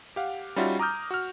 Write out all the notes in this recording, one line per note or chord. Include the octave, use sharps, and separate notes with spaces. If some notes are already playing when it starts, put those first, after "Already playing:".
G4 F5 F#5
G3 C#4 D#4 F4 F#4 E5
A#5 D6 D#6 F6 G6
F#4 F6